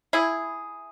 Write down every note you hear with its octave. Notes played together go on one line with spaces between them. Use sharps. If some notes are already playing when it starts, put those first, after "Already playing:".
E4 G#4